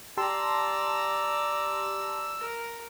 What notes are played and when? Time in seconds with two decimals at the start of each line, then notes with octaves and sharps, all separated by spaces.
0.17 G4 D5 A5 A#5 C6 E6
2.39 A#4